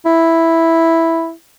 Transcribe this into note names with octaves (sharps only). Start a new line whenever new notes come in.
E4